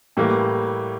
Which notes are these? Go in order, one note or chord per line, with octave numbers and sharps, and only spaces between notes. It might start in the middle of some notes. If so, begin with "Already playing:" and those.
A2 E3 G3 A#3